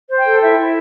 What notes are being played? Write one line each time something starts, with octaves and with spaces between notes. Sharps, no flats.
C5
G5
A4
E4 E5
E4